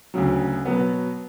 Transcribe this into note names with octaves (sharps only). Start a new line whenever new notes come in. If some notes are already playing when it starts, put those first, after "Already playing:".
D2 C#3 F#3
B2 F#3 B3